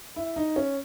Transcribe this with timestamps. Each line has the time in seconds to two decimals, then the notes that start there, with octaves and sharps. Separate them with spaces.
0.16 E4
0.36 D#4
0.56 C#4